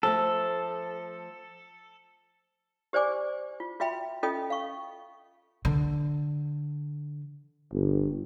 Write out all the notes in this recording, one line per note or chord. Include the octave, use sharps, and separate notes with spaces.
F3 A3 A4
G4 C5 D5 G#5 D6
F4
F4 F#4 E5 G5 B5
C#4 F4 A4 D#5 G5 D#6
F5 C#6
D3
G1